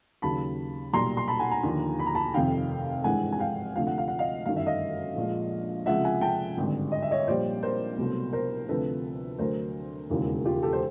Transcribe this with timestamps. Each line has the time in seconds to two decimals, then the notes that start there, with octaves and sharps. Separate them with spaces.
0.22 D#2 C#3 F#3 A5 B5
0.93 B1 A#2 G3 A#5 C6
1.17 C6
1.28 A5 B5
1.39 F#5 G#5
1.51 G#5 A#5
1.63 D#2 D3 F3
1.99 B5
2.06 A#5
2.15 A5 B5
2.34 F1 F2 C3 D#3 F5 G5
3.04 G#1 G2 E3 G#3 F#5 G#5
3.32 G#5
3.39 F5 G5
3.75 D2 C3 F3 A3 F5
3.87 F#5
3.98 F5
4.08 F#5
4.19 D#5 F5
4.46 G1 F#2 D#3 F5
4.56 E5
4.66 D#5 F5
5.15 A#1 A#2 F3 G#3
5.86 C#2 C3 F3 G#3 E5 F#5
6.04 F#5 G#5
6.21 G5 A5
6.58 G#1 G2 D3
6.92 D#5
7.02 E5
7.11 C#5 D#5
7.27 A#1 A#2 G3 C5 D5
7.63 A#4 C5
7.97 C2 B2 F#3 A3
8.33 A#4 C5
8.69 D2 C3 F3 A4 B4
9.38 D2 D3 F#3 A3 A#4 C5
10.10 E1 D#2 C#3 E3 G#3
10.45 F4 G4
10.63 G4 A4
10.73 C5